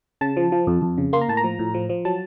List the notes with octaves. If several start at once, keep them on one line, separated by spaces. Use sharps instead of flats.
C#3 A5
F3
F3
F2
F2
C#3
A#3 C6
A#5
A2 A5
A#5
F3
A2
F3
F3
F#3 A5